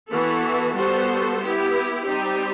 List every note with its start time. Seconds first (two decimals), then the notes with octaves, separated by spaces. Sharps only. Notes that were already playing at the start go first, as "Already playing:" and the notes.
0.11 E3 B3 F#4 A4
0.76 G3 B3 F#4 A4 C5
1.41 B3 E4 G4
2.06 G3 C4 D#4 G4